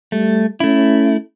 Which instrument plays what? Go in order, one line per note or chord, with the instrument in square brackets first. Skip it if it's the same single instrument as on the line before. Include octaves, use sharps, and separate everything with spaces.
[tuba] G3 [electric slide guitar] A3
[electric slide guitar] A3 E4 [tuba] C#4